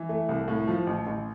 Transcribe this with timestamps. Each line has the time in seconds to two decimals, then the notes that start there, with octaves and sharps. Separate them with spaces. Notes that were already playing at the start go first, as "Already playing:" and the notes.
Already playing: E3
0.09 A3
0.29 C2
0.48 A2
0.68 F3
0.87 A1
1.07 A1